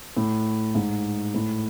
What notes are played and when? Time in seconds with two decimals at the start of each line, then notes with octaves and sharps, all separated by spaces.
0.17 A2
0.75 G#2
1.34 A2